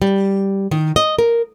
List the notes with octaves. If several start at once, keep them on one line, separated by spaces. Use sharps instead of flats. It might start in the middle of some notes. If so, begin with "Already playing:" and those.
G3
D#3
D#5
A#4